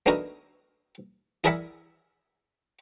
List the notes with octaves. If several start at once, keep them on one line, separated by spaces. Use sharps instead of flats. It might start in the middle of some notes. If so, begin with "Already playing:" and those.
A3 B3 D4 D#4 F#4 A#4
E4 G#4 A#4 D5 E5 F#5